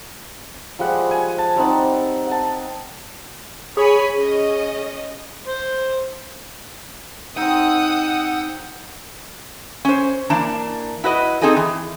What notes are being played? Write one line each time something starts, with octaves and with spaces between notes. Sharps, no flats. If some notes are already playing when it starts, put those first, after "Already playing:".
F3 G3 G#3 F#5
G#5
A5
G3 C4 D#4 F#5
F#5 A5
G#4 C#5 G#5 B5
C#4 D#5
C5
C4 D#4 F#5 D#6 E6 G6
C#4 C5
E3 A#3 D4 A5
E4 F#4 B4 D#5
C4 D#4 G#4 A4 D#5
E3